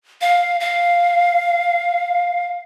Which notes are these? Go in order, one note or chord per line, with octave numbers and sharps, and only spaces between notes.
F5
F5